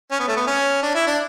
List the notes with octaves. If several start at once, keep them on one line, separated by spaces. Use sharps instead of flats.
C#4
B3
A3
B3
C#4
D4
E4
D4